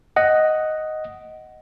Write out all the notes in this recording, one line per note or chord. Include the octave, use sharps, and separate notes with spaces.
D#5 F#5